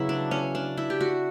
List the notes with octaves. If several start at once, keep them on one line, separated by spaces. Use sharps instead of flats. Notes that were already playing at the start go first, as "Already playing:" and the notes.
Already playing: C#3 F#3 B3 E4 F#4
D4
C#4
D4
E4
G4
F#4